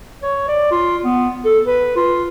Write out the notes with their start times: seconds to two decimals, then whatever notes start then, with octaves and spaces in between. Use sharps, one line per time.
0.23 C#5
0.48 D5
0.71 F4
1.04 B3
1.45 A4
1.66 B4
1.96 F4